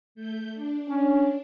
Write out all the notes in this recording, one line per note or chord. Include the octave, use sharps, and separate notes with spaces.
A3 G6
D4
C#4